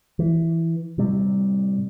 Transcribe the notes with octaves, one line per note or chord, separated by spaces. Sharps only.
E3
A2 C3 G3